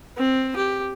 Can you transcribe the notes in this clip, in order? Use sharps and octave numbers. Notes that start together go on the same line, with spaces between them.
C4
G4